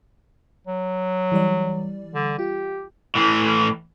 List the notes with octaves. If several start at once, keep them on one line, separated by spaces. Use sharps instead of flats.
F#3
E3 G3 D5
D3
F4 G4
A2 E3